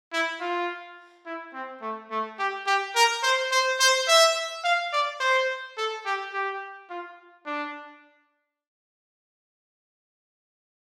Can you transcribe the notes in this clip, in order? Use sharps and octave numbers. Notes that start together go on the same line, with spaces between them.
E4
F4
E4
C4
A3
A3
G4
G4
A#4
C5
C5
C5
E5
F5
D5
C5
A4
G4
G4
F4
D4